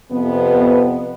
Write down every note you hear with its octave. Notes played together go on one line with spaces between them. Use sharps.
F2 C3 B3